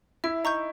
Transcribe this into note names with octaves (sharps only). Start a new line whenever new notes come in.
E4 E5
D#4 A#5 C#6 G6